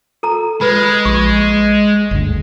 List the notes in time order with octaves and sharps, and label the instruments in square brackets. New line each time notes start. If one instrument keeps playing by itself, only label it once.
[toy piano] A4 A#5
[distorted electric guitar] G#3 [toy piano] B4 B5
[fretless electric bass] A#1 [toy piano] C#6
[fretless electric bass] G1 D2